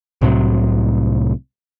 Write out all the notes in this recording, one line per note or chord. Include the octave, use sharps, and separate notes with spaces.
C2 A2 C3 F#3